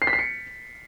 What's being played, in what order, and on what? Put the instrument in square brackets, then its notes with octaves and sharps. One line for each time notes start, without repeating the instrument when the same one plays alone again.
[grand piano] C7
B6
C7
C#7